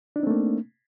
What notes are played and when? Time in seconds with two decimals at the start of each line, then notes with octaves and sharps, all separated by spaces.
0.16 D4
0.19 D#4
0.23 C4
0.27 A3
0.30 A#3